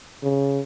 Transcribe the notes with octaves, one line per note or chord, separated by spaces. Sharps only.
C#3